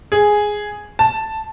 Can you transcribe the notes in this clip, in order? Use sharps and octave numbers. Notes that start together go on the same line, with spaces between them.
G#4
A5